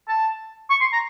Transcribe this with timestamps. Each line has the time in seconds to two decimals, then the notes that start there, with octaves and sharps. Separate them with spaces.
0.08 A5
0.70 C#6
0.81 C6
0.92 A#5